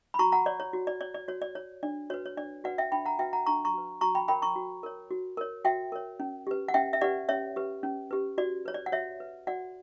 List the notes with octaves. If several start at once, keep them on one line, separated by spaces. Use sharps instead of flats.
B5
F#4 A#5 C#6
F#5 A#5
C#5 D5
C#5
F#4
D5
C#5 D5
D5
F#4 C#5
D5
C#5
D4 D5
F#4 B4 C#5
C#5
D4 D5
F#4 B4 D5 F#5
E5 G5
D4 G5 B5
F#5 A#5
F#4 B4 E5 G5
F#5 A#5
D4 A#5 C#6
A#5 C#6
F#4 B4
F#4 A#5 C#6
G5 B5
A#4 C#5 G5 B5
A#5 C#6
F#4
A#4 C#5
F#4
A#4 C#5
F#4 E5 G5
A#4 C#5
C#4
G4 B4
F#5
C#4 E5 G5
E5
G4 B4 D5 F#5
C#4 C#5 E5
G4 B4
C#4
G4 B4
F#4 D5
B4 C#5
D5
F#5
F#4 C#5 E5
B4
F#4 D5 F#5